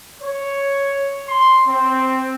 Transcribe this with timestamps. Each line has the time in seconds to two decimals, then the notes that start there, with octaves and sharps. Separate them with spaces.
0.22 C#5
1.29 C6
1.67 C4